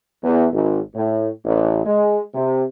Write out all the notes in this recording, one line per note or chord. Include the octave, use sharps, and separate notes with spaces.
E2
G#1
A2
A1
G#3
C3